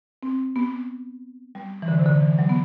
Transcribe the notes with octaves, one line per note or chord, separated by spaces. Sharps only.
C4
B3
G3
E3
D3
C3
D3
E3
F#3
B3